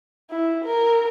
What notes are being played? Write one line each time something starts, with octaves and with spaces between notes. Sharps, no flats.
E4
A#4